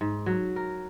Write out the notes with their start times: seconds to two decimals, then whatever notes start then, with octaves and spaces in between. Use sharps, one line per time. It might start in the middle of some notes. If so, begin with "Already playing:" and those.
0.01 G#2
0.26 F#3
0.56 A#4